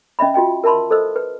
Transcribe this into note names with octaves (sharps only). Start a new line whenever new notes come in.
C#4 D#5 E5 B5
F4 F#4 D#5 G5
A#4 E5 A5 B5 C6
A4 C5 D#5 E6
B4